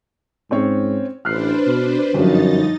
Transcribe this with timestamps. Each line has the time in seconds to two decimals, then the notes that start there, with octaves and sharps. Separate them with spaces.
0.51 G#2 C4 C#4 C#5
1.25 A1 D4 B4 C5 F6 F#6 C7
1.66 B2
2.14 G1 F#2 F3 D#4 D#5 A6